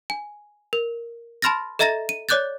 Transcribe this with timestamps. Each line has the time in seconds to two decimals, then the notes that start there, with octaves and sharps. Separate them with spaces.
0.10 G#5
0.73 A#4
1.42 A5 B5 C6 F6 A6 A#6
1.79 A4 D#5 E5 A#5 A6 A#6
2.09 D#7
2.29 C#5 D5 D6 F#6 G6 A6